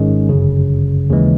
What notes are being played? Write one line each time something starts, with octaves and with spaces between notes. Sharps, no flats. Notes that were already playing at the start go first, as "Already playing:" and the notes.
Already playing: G#1 G#2 D#3 G#3 C#4
G1 F#2 C#3
D#2 C#3 E3 G#3